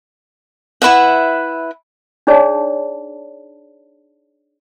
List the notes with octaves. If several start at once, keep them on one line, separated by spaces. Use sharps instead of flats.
E4 B4 E5 F#5
D4 D#4 G#4 C#5 D5 A5